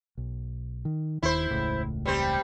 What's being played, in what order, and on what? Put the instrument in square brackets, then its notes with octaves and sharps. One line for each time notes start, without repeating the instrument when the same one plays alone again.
[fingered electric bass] B1
D#3
[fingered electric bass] D#1 D#2 D#3 [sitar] E4 C5
[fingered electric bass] E1 C#2 A2
[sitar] G3 C4 C5